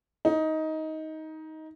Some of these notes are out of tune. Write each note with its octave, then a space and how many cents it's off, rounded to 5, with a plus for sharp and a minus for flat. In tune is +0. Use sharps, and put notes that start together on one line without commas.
D#4 +15